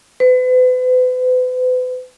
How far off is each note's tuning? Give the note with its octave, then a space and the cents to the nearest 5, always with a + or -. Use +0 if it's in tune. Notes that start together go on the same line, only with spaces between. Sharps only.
B4 +40